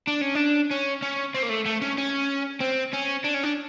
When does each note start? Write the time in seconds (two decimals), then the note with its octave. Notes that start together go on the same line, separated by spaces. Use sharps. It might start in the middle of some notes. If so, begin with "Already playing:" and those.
0.07 D4
0.21 C#4
0.35 D4
0.71 C#4
1.02 C#4
1.35 C4
1.43 A#3
1.50 A3
1.66 A3
1.82 C#4
1.98 C#4
2.60 C4
2.93 C#4
3.24 D4
3.34 C#4
3.44 D4